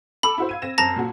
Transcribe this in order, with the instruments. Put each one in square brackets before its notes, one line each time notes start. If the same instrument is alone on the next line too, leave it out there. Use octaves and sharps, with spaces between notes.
[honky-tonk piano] A4 D6 E6 [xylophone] B5
[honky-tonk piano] E4 F#4 C5
F5 G#6 D#7
C4 A#6 E7
[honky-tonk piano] F#2 C4 [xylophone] A5 A#5 A#6
[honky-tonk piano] A#2 F#4